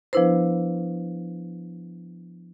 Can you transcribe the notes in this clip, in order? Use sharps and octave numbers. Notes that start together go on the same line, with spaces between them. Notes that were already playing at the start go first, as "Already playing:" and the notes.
F3 B3 D4 E4 B4 C5